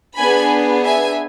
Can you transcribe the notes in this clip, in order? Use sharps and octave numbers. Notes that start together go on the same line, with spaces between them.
B3 D4 G#4 G#5 B5
E5 G#5